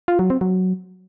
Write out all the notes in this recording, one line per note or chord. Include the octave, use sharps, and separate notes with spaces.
F4
F#3
C4
F#3